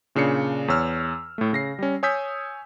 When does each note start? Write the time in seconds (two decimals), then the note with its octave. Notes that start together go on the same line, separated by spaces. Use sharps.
0.15 A#2 C#3 D4 C7 C#7
0.68 E2 C#5 E6 F6
1.38 A2 A3
1.53 C#3 A#6 C7
1.79 G3 C#4
2.03 C#5 G#5 D#6 E6 G6 B6